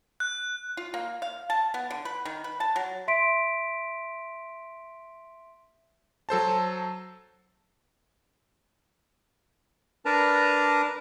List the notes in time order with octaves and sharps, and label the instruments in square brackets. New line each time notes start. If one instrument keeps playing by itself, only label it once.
[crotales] F#6
[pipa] F4
A#3
F5
A5
B3
D3
B4
D#3
B4
A5
F#3
[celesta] E5 C6 B6 D7
[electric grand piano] F#3 A4 C5 A5
[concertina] D4 A#4 B4 A5 A#5